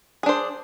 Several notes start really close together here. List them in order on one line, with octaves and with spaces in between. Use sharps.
G#4 D4 C5